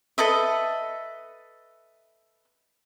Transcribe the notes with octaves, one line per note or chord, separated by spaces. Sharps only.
A4 B4 D#5 E5